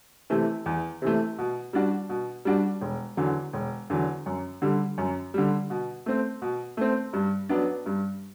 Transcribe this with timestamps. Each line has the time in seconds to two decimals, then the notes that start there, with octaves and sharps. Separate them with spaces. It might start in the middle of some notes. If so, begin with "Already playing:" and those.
0.30 C3 E3 A3
0.66 E2
1.02 C3 E3 A3
1.38 B2
1.73 G3 D4 F#4
2.09 B2
2.45 G3 D4 F#4
2.81 E1
3.17 E2 D3 F#3
3.53 E1
3.90 E2 D3 F#3
4.26 F#2
4.62 D3 G3
4.98 F#2
5.34 D3 G3
5.70 B2
6.06 A3 C4
6.42 B2
6.77 A3 C4
7.13 G2
7.49 F#3 B3 D4
7.86 G2